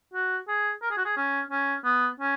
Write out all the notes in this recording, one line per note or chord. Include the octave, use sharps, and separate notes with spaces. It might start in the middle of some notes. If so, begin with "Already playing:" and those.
F#4
G#4
A#4
G#4
F#4
G#4
C#4
C#4
B3
C#4